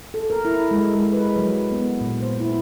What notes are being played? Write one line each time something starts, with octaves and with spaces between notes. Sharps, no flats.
A4
A#4
E4
G#3
G#3
B4
F#3
B3
A#2
C5
E4